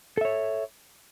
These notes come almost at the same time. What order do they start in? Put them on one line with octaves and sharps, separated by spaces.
A4 E5 C#5